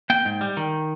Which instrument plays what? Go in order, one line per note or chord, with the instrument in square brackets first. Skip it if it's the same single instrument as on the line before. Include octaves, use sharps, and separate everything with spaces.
[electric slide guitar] A#3 G5
G#2
G3
D#3